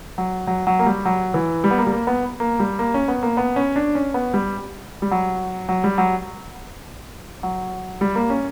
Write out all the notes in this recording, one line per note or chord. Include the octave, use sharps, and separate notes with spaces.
F#3
F#3
F#3
A#3
G3
F#3
E3
G3
B3
A#3
G3
A#3
B3
A#3
G3
A#3
C#4
B3
A#3
B3
C#4
D4
C#4
B3
G3
G3
F#3
F#3
G3
F#3
F#3
G3
A#3
C#4